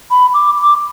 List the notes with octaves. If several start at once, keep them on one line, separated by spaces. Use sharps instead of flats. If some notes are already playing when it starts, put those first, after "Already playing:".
B5
D6
D6